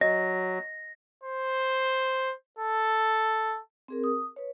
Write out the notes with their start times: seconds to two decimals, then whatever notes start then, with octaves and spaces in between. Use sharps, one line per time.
0.01 F#3 D#5 A#6
1.23 C5
2.59 A4
3.88 C4 G#4 A#4
4.04 D#6
4.36 B4 C#5